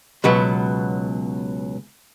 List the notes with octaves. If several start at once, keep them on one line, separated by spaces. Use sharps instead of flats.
C#2 B2 F#3 B3